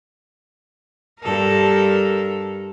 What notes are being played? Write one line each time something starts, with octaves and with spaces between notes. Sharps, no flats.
G2 A4 A#4